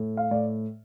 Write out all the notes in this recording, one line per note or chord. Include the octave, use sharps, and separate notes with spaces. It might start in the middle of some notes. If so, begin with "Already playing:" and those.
Already playing: A2
F5
A2 D5